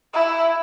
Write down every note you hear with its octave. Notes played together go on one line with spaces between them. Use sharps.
E4